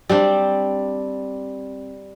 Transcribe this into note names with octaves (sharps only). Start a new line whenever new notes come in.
G3 C4 D4